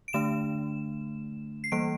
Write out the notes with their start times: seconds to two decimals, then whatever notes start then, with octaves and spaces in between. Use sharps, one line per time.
0.08 D7
0.13 D3 A3 D4 E7
1.64 C7
1.72 E3 G3 A#3 D7